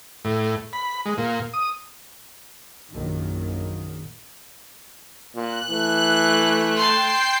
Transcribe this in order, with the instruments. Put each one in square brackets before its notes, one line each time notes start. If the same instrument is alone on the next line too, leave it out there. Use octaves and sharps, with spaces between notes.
[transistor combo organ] A2
B5
G#3
A#2
D#6
[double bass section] A#1 F#2 A#2 D#3 F#3
[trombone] A#2 [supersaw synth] F#6
[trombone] E3 [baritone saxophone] A3
[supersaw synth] G5 C7 [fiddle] A5 C6